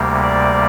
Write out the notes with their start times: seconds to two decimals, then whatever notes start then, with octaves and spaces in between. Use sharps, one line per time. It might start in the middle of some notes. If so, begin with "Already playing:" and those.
Already playing: D2 C3 G3 A#3
0.22 D5